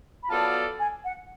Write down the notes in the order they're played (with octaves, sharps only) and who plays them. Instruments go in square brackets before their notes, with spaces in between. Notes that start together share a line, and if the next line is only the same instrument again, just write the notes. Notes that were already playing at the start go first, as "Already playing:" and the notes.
[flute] B5
[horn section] F#3 B3 F4 A4 D5 [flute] A5
[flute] G#5
F#5